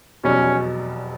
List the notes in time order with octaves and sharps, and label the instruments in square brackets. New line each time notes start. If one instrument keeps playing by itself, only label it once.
[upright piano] F1 E2 B2 F#3 [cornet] C#4